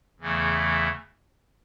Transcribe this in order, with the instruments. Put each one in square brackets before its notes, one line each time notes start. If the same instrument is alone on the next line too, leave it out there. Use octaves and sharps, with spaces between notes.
[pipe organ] E2 C#3 E3 A3